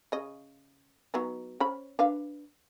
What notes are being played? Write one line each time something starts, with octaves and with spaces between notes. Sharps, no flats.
C#3 D#5
F#3 B3 D#4
C#4 C5 B5
D4 B4 F5